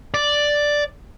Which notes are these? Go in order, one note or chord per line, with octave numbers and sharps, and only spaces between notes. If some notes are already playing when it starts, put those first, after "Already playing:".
D5